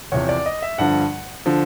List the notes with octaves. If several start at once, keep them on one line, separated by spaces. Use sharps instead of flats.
E2 C3 F3 C#5
D5
D#5
E5
G2 D3 F3 F#5
D3 F3